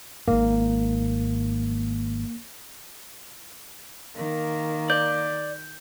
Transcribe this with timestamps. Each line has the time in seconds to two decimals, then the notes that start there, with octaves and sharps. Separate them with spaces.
0.28 G#1 G#2 A#3
4.16 D#3 A#3
4.90 D5 G6